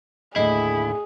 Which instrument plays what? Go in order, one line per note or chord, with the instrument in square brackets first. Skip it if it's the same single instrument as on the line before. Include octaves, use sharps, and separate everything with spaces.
[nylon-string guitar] D#2 A2 D3 [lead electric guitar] E4 [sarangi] G#4 [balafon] D#5